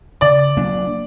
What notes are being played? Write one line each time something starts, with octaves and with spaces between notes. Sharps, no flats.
C#3 D5
F#3 A#3 D4